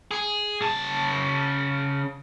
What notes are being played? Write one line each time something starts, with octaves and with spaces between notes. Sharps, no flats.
G#4
C#3 A5